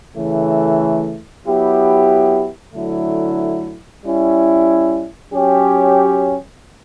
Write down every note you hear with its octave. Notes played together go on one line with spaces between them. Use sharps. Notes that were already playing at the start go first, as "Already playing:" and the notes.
C#3 E3 A3
F#3 B3 E4 G4
D3 F#3 A3 E4
G3 C#4 E4
F#3 C#4 G4